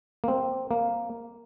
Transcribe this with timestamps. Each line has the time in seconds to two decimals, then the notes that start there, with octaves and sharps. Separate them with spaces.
0.24 A#3
0.28 C4
0.71 A#3